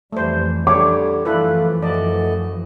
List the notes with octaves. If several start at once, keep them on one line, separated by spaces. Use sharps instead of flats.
F2 E3 G3 A3 C5
D3 G3 C#5 D6
F#2 E3 F3 A3 E4 F4 A4 B4
A3 F#4 D5 D#5